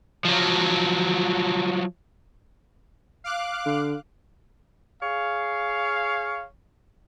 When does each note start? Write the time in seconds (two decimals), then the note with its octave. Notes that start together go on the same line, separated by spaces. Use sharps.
0.25 F3 F#3
3.24 F5 D6 F#6
3.66 D3
5.02 G#4 C#5 F5